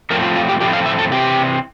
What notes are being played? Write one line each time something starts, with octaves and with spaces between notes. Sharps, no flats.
A2 F3 A3 C4 A#4
F4
F4
G4
A2 F3 A3 C4 G4
F5
E5
A4
C3 E3 C4 G4